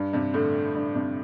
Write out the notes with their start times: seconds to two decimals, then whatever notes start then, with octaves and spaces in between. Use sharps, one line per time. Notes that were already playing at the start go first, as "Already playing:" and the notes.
Already playing: G2
0.13 G2 C3
0.34 A2 D3
0.75 G2
0.95 G2 C3